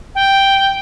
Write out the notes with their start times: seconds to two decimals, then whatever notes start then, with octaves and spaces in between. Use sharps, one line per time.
0.15 G5